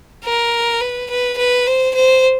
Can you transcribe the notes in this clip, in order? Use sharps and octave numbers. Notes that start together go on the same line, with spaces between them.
A#4
B4
B4
B4
C5
C5